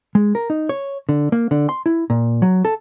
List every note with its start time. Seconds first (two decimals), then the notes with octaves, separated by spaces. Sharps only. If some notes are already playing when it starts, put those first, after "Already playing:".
0.15 G#3
0.35 A#4
0.50 D#4
0.69 C#5
1.09 D3
1.32 A#3
1.51 D3
1.69 C6
1.86 E4
2.10 A#2
2.42 F#3
2.65 A4